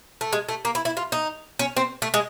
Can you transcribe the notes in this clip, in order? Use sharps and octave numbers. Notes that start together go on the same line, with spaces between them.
A3
G#3
A3
A#3
E4
E4
F4
D#4
C#4
C4
A3
G#3